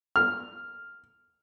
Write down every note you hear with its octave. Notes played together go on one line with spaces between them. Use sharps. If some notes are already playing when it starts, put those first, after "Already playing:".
F6